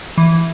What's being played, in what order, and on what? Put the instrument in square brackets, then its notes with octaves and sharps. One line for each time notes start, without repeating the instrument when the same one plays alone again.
[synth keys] E3